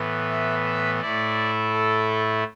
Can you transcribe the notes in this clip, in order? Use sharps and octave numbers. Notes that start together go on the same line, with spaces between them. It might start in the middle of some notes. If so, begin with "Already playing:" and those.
Already playing: A2 E3 B3
E5
E5
A2 A3 E4 D5
A4